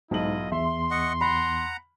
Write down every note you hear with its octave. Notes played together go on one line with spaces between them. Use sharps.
B1 G#2 E4 F4 D#5 F#7
E2 E5 C6
D#5 F#5 C#6
F#5 A#5 B5